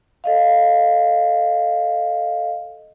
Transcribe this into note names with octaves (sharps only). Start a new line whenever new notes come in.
A4 D#5 F5